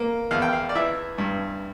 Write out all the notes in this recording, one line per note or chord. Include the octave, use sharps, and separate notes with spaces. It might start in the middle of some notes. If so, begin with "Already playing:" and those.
Already playing: A#3
E2 F5
G5
F5
D5
E3 E5
G2